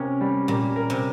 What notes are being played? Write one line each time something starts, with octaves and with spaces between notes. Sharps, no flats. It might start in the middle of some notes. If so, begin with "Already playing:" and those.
Already playing: C3 C#4 A#4
G3
A#2 G3
A#4
C3